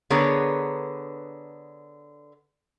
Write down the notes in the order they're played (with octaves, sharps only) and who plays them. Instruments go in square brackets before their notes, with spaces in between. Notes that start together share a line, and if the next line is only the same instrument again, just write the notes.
[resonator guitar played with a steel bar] D3 B3 G#4 A#4 B4 C#5